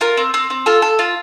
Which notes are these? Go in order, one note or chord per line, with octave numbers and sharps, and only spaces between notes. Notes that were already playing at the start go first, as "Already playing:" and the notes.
F4 A#4
C4
C4
C4
F4 A4
A4
F4